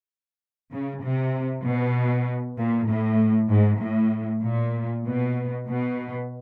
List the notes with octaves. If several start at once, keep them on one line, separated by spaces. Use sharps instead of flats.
C#3
C3
B2
A#2
A2
G#2
A2
A#2
B2
B2